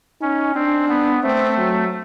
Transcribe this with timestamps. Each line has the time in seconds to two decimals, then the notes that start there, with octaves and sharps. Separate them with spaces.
0.21 C#4 D#4
0.55 C4 D4
0.89 B3
1.23 A3 C4
1.58 F#3